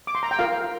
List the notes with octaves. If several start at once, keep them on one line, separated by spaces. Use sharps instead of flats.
D6
C6
A#5
G5
F4 A#4 F5